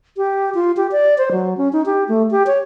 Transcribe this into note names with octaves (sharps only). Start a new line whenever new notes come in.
G4
F4
G4
D5
C5
F#3
C#4
D#4
G4
A3
G4
C#5